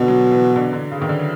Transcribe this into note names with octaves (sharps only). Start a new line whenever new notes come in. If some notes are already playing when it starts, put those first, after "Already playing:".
Already playing: B2 D3
F#3
E3
D3
D3
C#3
D#3
D3